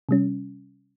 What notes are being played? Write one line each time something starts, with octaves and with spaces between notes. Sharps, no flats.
C3 G3 C#4